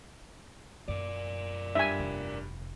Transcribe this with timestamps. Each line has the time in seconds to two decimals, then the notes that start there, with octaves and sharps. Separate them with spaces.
0.88 F#2 A#4 D5
1.75 G2 E5 G#5
2.00 F1